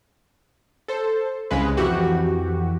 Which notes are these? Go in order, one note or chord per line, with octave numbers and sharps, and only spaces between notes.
A4 C5
C2 C#3 G#3 B4
F2 E3 F#4 G4